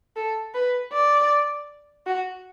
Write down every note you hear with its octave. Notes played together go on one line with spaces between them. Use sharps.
A4
B4
D5
F#4